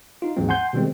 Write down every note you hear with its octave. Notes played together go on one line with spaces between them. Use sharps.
D#4 F4
D#2 G#2 E3 F#3 G#3 C4
F#5 G#5 C6 G6
B2 D#3 G3 G#3 C4